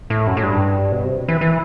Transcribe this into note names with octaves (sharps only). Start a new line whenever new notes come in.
A2
F#2
A2
G2
B2
C3
E3
E3